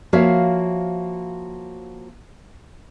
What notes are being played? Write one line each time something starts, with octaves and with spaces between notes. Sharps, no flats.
F3 A#3 F#4 C#5 E5 F5